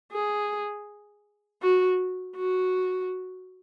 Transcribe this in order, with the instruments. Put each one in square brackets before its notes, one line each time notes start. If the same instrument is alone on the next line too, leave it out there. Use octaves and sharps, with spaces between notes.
[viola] G#4
F#4
F#4